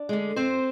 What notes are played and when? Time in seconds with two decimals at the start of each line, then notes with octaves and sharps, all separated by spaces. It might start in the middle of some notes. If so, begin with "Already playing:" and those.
Already playing: D4 D5
0.09 D3 G#3
0.36 F2 C4 C5